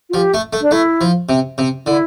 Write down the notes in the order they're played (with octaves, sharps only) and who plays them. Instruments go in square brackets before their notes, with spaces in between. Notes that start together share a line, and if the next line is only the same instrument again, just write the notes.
[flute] F4
[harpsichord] F3 [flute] G4
[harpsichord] A3
A3
[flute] D4
[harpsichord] A3 [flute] E4
[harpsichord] F3
C3
C3
[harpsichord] D3 [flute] E4